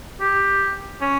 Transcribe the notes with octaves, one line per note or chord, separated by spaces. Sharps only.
G4
C#4